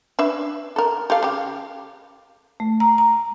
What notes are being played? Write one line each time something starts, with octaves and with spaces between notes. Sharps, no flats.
D4 B4 E5
A4 A#4
G4 A4 F5
C#3 G4
A3
A#5
A#5